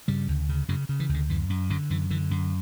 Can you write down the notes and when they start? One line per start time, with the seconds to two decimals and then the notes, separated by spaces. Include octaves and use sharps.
0.08 G2 C#3 G3
0.28 D2
0.49 C#3
0.69 F#2 C#3 F#3
0.89 C#3
1.00 E3
1.09 D2
1.14 D3
1.29 F#2 E3
1.50 F#2
1.70 F#2 D3 F#3
1.90 F#2 E3
2.10 D3 E3
2.31 F#2